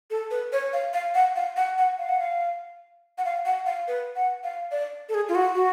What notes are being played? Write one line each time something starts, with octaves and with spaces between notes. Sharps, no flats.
A4
B4
C#5
F5
F5
F#5
F5
F#5
F#5
F5
F#5
F5
F#5
F5
F#5
F5
B4
F#5
F5
D5
A4
G#4
F4
F#4
F#4